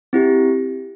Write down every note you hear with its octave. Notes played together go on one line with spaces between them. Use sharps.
C4 E4 G4